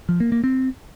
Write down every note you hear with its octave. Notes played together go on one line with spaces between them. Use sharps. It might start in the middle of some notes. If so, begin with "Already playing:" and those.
F3
A#3
A#3
C4